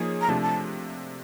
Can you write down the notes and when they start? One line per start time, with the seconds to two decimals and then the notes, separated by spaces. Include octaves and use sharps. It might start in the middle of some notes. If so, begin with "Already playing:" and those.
Already playing: F3 A#3 D#4 G#4 C#5
0.21 A#5
0.28 C3 F3 A3 D4 A5
0.42 A5